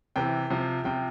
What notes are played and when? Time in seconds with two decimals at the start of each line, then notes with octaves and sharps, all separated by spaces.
0.16 C3 E3 G5
0.50 C3 F3
0.84 C3 F3 G5